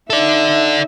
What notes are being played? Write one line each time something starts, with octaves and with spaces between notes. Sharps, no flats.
D#4 A4 D5 E5